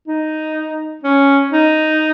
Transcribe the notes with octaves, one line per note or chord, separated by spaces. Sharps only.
D#4
C#4
D#4